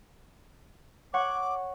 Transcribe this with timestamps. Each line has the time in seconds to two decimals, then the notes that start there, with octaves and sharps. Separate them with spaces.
1.13 C#5 F#5 C#6 D6